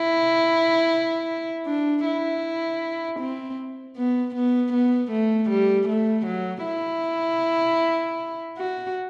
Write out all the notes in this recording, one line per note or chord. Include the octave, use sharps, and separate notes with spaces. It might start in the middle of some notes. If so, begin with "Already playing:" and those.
Already playing: E4
D4
E4
C4
B3
B3
B3
A3
G3
A3
F#3
E4
F#4